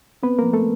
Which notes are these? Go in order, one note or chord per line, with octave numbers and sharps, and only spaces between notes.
B3 C4 B4
F3 A#3 A#4
A3 A4